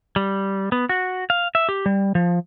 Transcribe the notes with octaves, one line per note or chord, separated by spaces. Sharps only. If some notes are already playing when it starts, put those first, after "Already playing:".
G3
B3
F#4
F5
E5
G4
G3
F3